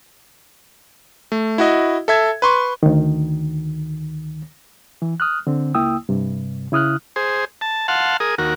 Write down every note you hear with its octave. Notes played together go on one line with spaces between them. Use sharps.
A3
E4 F#4 D#5
A4 E5 G#6
B4 C6 C#6
D2 D#3
E3
D#6 F6 F#6
D3 C4
C#2 A#3 E4 G5 D#6 E6
G2 C3
C#3 E4 D#6 F6 F#6
G#4 C5
A5
F5 F#5 A5 C6
G#4 A#4 D#6
D#2 F#4 A#4